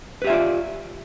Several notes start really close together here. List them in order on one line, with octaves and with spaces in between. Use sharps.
B4 G4 E5 F4 D5